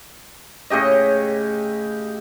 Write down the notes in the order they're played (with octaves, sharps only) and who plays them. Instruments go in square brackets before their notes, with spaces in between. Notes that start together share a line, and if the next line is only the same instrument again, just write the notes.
[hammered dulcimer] A2 C#3 G4 D#5